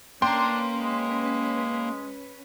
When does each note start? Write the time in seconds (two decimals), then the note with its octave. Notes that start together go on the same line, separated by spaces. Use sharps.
0.22 A#3 C#4 D4 B4 G5 A#5 C6
0.80 G#3